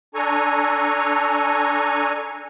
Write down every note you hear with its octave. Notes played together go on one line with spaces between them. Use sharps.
D4 A4 G#5 A#5 C#6